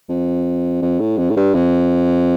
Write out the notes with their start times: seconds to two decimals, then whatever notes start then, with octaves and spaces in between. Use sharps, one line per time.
0.09 F2
0.82 F2
1.00 A2
1.18 F2
1.30 A2
1.36 G2
1.54 F2